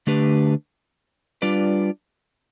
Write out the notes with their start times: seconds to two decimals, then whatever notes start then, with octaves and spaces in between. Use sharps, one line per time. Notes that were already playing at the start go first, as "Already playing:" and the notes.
0.07 D3 A3 D4 G4 B4
1.42 G3 D4 F4 B4 D5